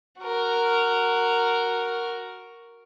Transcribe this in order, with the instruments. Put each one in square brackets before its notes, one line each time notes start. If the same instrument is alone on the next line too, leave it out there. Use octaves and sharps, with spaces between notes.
[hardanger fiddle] F#4 A#4